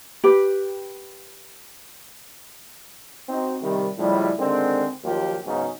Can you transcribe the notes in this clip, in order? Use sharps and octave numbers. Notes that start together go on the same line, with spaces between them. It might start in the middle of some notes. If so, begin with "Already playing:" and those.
G4 B4
C4 D#4 F#4
C3 D#3 G3
C#2 A2 F3 G3
D3 D#3 G#3 C4
D#2 F3 F#3 A#3 F4 G4
G#2 C#3 F#3 B3 C#4 D#4